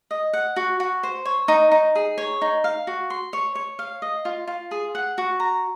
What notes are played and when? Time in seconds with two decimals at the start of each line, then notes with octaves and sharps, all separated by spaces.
0.11 D#5
0.33 F#5
0.56 F#4
0.80 F#4
1.03 C5
1.25 C#5
1.48 D#4
1.72 D#4
1.95 G#4
2.18 C#5
2.42 D#4
2.64 F5
2.87 F#4
3.10 C6
3.33 C#5
3.55 C#5
3.79 F5
4.02 D#5
4.25 F4
4.47 F4
4.71 G#4
4.95 F#5
5.18 F#4
5.40 A#5